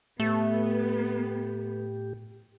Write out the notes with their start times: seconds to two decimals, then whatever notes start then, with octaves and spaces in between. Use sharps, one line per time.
0.20 A2 A3 B3 G4